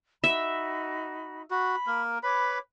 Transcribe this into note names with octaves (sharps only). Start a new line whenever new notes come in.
D#4 F#4 E5 B5
F#4 B5
A#3 A#4
B4 C#5 B5 D6